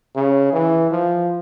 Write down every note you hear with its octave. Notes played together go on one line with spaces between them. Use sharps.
C#3
E3
F3